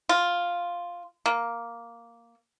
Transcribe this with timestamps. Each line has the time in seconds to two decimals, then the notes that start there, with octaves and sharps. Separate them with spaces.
0.09 F4
1.26 A#3